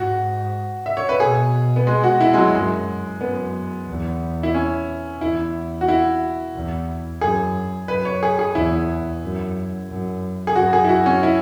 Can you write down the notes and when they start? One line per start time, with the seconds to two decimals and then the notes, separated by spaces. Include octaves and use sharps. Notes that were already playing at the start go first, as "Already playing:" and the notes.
Already playing: G#2 F#4
0.86 E5
0.97 C#5
1.09 B4
1.20 B2 G#4
1.76 B3
1.87 G#3
2.03 F#4
2.21 E4
2.33 G#3
2.38 F#3
2.53 F#2 G#3
3.20 F#2 B3
3.88 E2
4.43 E4
4.54 C#4
5.21 E2 E4
5.81 F#4
5.88 E4
6.55 E2
7.21 F#2 G#4
7.88 F#2 B4
8.05 C#5
8.23 G#4
8.39 G#4
8.55 E2 E4
9.22 F#2
9.89 F#2
10.47 G#4
10.55 F#2 F#4
10.73 G#4
10.84 E4
10.89 F#4
11.06 C#4
11.23 E4